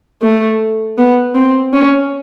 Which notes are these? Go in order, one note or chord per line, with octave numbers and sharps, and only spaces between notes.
A3
B3
C4
C#4